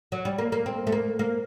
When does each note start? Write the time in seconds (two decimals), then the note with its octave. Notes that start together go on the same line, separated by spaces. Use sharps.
0.12 F#3
0.25 G3
0.38 A#3
0.52 A#3
0.66 C4
0.87 A3
0.92 A#3
1.19 A#3